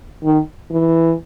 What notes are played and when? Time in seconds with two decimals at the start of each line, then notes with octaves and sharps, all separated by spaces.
0.24 D#3
0.71 E3